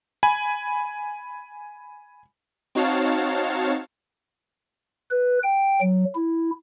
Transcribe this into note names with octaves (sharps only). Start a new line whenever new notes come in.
G#5 B5
C4 D#4 F#4 C#5 F5 A5
B4
G5
F#3
E4